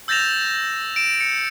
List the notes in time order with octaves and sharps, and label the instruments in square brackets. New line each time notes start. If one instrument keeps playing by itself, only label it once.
[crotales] E6 G6 A6 A#6 E7 F7
D7 E7
C#7